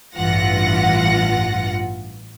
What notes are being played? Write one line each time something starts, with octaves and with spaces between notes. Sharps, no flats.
A1 G2 E3 F4 F#5 A#6